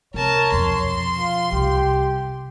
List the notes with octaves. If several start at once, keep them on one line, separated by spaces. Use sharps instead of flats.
C3 A#4 C#5 A5
B1 F2 C6
F4
C2 G4